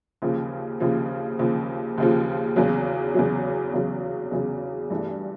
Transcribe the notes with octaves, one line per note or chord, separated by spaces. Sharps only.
D#2 C#3 F3
D#2 C#3 F3
D#2 C#3 F3
D#2 C#3 F3
E2 C#3 F#3
E2 C#3 F#3
E2 C#3 F#3
E2 C#3 F#3
G2 E3 A3